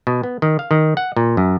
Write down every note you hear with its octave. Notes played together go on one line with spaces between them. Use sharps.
B2
B3
D#3
F5
D#3
F#5
A#2
F#2